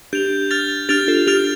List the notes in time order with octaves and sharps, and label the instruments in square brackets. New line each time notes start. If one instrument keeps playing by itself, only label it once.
[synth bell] D4 G4 [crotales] G6 F7
[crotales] F6 A6 F7
[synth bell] D4 G4 [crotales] F6 A6 F7
[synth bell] F4 A4
[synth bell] D4 G4 [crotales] F6 A6 F7